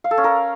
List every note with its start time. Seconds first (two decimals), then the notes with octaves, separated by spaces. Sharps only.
0.04 F5
0.11 A4
0.18 C#4
0.24 A#4